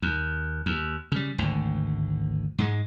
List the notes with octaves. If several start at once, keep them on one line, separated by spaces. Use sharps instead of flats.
D#2
D#2
C#3 G3
G#1 D2 A2
G#2 G#3